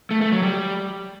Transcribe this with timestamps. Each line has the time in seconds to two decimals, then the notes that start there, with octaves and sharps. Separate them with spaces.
0.11 A3
0.21 A3
0.32 F#3
0.43 G3